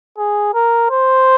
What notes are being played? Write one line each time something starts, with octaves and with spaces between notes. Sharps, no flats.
G#4
A#4
C5